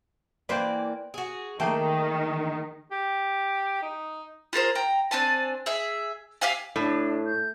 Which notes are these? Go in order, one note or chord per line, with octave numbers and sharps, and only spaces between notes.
E3 A#3 B4 C5 D5 G5
F#4 G#4
D#3 A3 A#3 G#4 G5
G4
D#4
F4 G#4 A#4 C5
G5 A#5
C4 D4 G#5 A5
G#4 E5
G4 E5 F5 G#5
A2 D4
G6